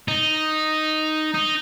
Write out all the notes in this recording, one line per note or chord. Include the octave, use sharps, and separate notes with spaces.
D#4
D#4